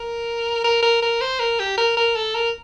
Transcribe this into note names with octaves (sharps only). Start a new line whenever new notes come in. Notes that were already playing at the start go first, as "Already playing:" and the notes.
Already playing: A#4
A#4
A#4
A#4
C5
A#4
G4
A#4
A#4
A4
A#4